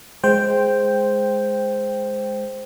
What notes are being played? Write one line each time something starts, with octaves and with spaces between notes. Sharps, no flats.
G#3 C5 G5